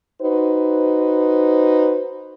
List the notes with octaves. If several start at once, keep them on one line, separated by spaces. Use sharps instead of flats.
D#4 F#4 B4 C5